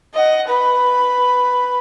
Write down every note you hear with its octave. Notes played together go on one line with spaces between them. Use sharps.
D#5 F#5
B4 B5